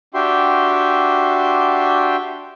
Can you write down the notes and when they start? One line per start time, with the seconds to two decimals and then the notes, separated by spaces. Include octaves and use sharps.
0.14 D4 F#4 G4 E5 G5 C6